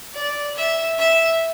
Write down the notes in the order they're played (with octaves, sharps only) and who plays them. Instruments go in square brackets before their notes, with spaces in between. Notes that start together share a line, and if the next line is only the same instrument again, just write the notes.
[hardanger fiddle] D5
E5
E5